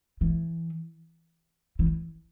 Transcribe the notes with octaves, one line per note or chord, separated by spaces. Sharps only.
E3
E3